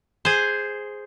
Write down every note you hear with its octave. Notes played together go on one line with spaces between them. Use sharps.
G#4 C5